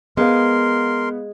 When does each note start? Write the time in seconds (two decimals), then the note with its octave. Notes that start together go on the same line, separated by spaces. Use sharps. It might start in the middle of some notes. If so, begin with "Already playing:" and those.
0.17 G#3 B3 A#4 F5 C6